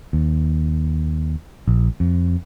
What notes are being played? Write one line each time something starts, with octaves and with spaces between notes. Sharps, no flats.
D#2
A#1
F2